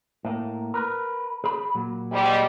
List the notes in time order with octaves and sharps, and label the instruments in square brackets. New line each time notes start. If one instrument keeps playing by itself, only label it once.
[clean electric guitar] A2 A#3
A#4 B4
G#4 B5
A#2 F#3
[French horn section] G#2 G3